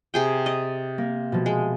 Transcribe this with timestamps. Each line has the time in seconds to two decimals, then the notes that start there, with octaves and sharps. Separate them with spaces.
0.14 C3 G#4 G5
0.46 D#5 D#6 A6 D7
0.98 A#3
1.32 B2 F3
1.46 G#3